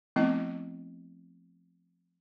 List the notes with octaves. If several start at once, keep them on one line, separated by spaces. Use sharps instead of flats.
F3 A3 B3 C4 E4 D#5